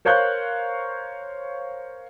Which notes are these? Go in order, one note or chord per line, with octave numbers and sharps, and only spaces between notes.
A#4 C5 C#5 F5 F#6 G6